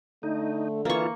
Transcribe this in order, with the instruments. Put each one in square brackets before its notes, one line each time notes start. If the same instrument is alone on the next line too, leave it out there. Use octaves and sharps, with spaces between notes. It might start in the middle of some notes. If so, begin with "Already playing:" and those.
[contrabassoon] D3 [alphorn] A3 [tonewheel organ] D#4
[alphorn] E3 [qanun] A#3 C#6 [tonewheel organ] E4 F4